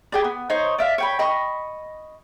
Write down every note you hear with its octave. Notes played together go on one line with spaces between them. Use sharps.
G4 G#4 D5
B3
D#4 C5 C#5
D5 E5 F5
C#5 G5 B5
D#5 B5 C#6